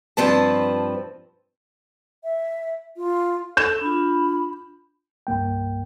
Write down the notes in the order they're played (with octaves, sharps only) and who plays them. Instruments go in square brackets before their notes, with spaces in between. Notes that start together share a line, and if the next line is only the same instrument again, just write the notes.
[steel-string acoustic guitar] G2 F3 C4 B4 A5
[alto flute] E5
F4
[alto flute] A4 [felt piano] G6 E7
[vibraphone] D4 F4 [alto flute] B5
[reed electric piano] C2 G2 A#3 G5